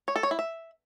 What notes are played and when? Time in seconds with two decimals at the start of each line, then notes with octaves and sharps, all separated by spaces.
0.08 C#5
0.16 A4
0.23 C#5
0.31 E4
0.39 E5